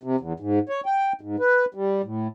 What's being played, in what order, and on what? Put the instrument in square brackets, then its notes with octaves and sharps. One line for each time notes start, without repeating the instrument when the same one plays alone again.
[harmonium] C3
E2
G#2
C#5
G5
G#2
B4
G3
A2